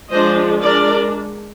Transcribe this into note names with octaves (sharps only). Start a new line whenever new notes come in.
F3 G#3 D4 C5 D#5
G#3 D4 A#4 D5